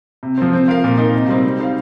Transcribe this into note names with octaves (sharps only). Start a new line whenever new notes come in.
C3
F3 C4
C4
F4 A#4 F5
A#2
A#3 D#4
C3
G3 C4 D#4
G3
D#4 C5 F5